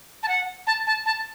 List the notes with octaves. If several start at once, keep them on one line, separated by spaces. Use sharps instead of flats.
A5
F#5
A5
A5
A5